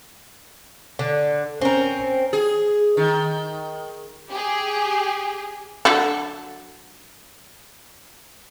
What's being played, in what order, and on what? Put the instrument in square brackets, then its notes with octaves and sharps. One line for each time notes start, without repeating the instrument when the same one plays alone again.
[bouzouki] D3
[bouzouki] C4 A#4 [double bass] C#4
[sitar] G#4
D#3
[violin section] G4 G#4
[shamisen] D3 F#3 A4